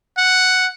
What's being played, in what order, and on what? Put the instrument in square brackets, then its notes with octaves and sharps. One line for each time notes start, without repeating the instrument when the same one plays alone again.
[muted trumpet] F#5